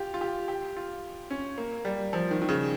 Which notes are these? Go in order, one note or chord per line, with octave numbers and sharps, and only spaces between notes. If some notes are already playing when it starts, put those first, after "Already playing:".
Already playing: F4 G4
F4
G4
G4
F4
C#4
A#3
G3
F3
D#3
D#3
C#3